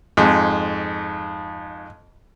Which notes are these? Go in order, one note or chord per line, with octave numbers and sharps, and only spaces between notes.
F2 G#2